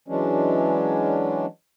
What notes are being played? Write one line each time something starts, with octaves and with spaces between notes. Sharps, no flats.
E3 F#3 G#3 C#4 D4